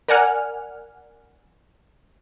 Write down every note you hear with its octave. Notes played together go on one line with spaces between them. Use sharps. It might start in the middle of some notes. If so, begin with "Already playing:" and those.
A#4 D5 F#5 G#5 F6